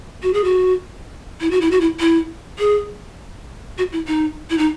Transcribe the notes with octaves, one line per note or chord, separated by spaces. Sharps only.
F#4
G#4
F#4
E4
F#4
E4
F#4
E4
E4
G#4
F#4
E4
D#4
E4
D#4